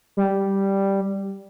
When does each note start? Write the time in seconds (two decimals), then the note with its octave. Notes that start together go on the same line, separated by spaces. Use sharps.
0.17 G3